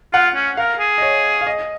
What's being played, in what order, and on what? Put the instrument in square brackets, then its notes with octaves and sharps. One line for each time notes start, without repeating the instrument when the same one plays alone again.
[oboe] F4 [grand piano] F#5
[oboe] C#4
[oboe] A#4 [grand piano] F5
[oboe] G#4
[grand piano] D#5
C#5
F5
D#5